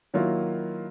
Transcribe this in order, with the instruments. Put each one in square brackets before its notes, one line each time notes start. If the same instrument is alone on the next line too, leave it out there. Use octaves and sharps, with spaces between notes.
[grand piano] D#3 F#3 A#3 E4 F4